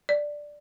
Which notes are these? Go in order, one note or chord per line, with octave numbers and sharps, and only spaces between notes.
D5